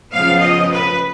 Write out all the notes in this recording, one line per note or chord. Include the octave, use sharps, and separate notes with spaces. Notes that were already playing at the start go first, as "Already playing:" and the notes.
C#3 F3 B3 F5
D#5
B4